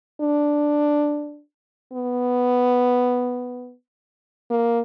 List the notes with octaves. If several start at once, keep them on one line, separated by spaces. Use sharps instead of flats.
D4
B3
A#3